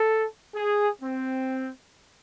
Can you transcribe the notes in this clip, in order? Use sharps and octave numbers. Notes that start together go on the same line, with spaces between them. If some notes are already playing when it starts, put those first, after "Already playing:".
Already playing: A4
G#4
C4